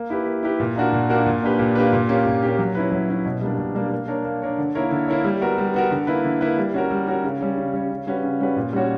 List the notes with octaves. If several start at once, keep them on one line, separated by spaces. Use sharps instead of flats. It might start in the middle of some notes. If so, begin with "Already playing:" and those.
Already playing: A#3
E4 G4 B4
A#3
E4 G4 B4
A#2
A#3 D4 F#4 A#4
A#2
A#3 D4 F#4 A#4
A#2
A#3 D4 G4 B4
A#2
A#3 D4 G4 B4
A#2
A#3 C#4 G4
A#2
A#3 C#4 G4
F#3
C#4 E4 B4
F#3
C#4 E4 B4
B2
G3 A#3 D4
B2
G3 A#3 D4
A#3
D4 A#4 C#5
A#3
D4 A#4 C#5
D3
A#3 E4 A#4 C#5
D3
A#3 E4 A#4 C#5
G3
B3 F#4 A#4
G3
B3 F#4 A#4
D3
A#3 E4 B4
D3
A#3 E4 B4
G3
C#4 F#4 A#4
G3
C#4 F#4 A#4
C#3
G3 C#4
C#3
G3 C#4
C#3
G3 C#4 F#4 B4
C#3
G3 C#4 F#4 B4
A#2
G3 C#4 F#4 C#5